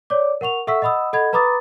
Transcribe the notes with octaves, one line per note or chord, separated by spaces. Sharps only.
C#5 D5 D6
A#4 F#5 C#6 F7
A4 E5 F#5 C#6 E6 B6
D#5 F#5 B5 D#6 E6
A4 D#5 F#5 B5 G#6
B4 A#5 B5 D6 D#6 A6